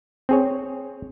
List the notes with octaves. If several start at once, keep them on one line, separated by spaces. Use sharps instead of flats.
C4 G#4 C#5